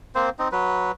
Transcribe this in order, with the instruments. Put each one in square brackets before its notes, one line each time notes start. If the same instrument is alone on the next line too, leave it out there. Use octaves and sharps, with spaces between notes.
[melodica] A#3 C4 C5
C4 D#4
F#3 B4